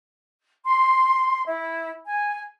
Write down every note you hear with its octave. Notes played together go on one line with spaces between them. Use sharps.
C6
E4
G#5